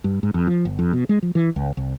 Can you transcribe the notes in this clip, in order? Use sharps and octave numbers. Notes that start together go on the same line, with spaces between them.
G2
G#2
F2
F3
G1
F2
B2
G#3
F3
E3
C#2
C2